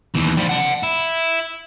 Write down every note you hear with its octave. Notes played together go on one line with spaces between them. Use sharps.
D#2 E3
F3 G3
F#5 A5
E4